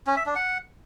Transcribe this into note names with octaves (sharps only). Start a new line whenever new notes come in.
C#4
E5
D4
F#5